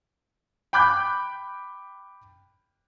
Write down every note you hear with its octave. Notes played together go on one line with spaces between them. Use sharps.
G5 B5 D6 F#6 G6